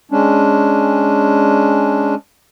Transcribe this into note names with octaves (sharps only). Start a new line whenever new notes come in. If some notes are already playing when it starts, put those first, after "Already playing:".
G#3 C#4 D4